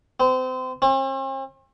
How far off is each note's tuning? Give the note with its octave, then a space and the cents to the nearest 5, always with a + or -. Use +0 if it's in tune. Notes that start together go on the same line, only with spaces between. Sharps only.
C4 -30
C4 +45